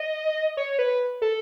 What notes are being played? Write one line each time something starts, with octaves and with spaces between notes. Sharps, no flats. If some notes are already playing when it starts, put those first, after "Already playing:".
Already playing: D#5
C#5
B4
A4